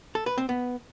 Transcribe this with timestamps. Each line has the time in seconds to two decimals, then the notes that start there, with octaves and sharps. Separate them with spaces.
0.15 A4
0.26 B4
0.38 C4
0.49 B3